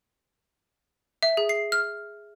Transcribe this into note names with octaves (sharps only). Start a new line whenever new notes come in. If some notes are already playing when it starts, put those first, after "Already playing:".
E5
G#4
C7
F6